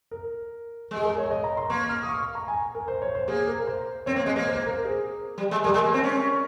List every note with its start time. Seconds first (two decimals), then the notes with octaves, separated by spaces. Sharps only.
0.11 A#4
0.91 G#3
0.96 G#4
1.04 A#4
1.18 C#5
1.31 D#5
1.44 A#5
1.57 C6
1.70 A#3 C#6
1.89 F6
2.03 D#6
2.09 C#6
2.35 A#5
2.48 G#5
2.75 A#4
2.88 C5
3.02 C#5
3.15 C5
3.28 A#3 G#4
3.47 A#4
3.67 C5
4.06 C4 C#5
4.16 A#3
4.26 G#3 D#5
4.36 A#3
4.45 C5
4.56 C5
4.66 A#4
4.85 G#4
5.38 G3
5.51 G#3
5.64 G3 A#4
5.74 G#3
5.84 A#3
5.94 C4
6.03 C#4